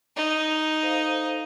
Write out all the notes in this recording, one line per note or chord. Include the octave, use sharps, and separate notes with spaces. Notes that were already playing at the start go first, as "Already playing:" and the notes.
D#4
A4 C5 F5